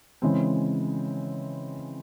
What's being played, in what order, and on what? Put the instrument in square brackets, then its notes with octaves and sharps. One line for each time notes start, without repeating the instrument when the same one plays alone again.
[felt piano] C#3 E3 G#3 C4